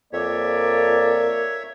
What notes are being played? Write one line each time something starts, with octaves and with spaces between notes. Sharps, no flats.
F2 A#3 C#5 D5 E5